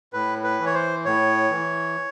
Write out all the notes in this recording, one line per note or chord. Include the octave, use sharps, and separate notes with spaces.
A2 B4
B4
E3
C#5
C5
A2 C#5
E3